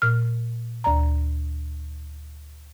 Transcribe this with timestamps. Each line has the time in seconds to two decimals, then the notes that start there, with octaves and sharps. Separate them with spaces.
0.02 A#2 F6
0.84 D2 D5 A#5